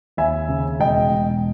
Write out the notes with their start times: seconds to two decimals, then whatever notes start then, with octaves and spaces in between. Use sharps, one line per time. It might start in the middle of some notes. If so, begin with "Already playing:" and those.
0.17 D#2 E5 G#5
0.48 C#3
0.79 E1 D#5 G5
1.11 E1